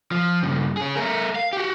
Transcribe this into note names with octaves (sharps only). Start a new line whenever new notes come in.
F3
G2 C#3
C#4 G#4
A3 A#4
F5
F#4 G4